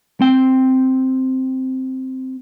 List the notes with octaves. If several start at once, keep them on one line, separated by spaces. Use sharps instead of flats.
C4 G5